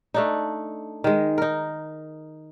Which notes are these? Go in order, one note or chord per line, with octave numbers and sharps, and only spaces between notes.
A3 D4 D#4
D#3 G#3
D#4 A#4